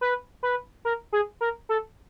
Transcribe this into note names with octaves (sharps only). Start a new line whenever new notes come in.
B4
B4
A#4
G#4
A#4
A4